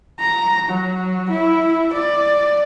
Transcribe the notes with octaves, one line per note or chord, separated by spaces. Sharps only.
A#5
F#3
E4
D5